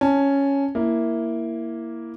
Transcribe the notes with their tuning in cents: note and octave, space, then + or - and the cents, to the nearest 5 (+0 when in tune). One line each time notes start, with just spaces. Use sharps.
C#4 +0 A5 +0
A#3 +0 E4 +0